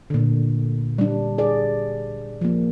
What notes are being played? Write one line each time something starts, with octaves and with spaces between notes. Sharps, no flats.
A#2 D3
G3 D4
G#4 D5
F3 A#3